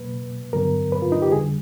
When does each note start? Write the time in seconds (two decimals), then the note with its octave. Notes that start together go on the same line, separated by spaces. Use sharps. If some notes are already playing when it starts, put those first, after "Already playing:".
Already playing: C#2 B2 F#3 A#3 B4
0.53 G2 D3 F#3 B3 A#4
0.92 B4
1.02 F4
1.12 D#4
1.22 G4
1.32 F2 D3 G3 G#4